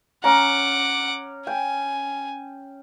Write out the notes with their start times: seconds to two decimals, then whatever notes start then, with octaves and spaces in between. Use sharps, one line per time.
0.24 C#4 F#5 A#5 D6
1.47 G5 G#5